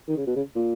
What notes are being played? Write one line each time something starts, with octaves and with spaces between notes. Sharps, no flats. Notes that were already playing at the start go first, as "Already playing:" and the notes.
D#3
C#3
B2
C#3
A#2